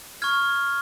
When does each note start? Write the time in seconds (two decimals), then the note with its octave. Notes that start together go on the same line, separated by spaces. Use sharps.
0.22 C#6 F6 G#6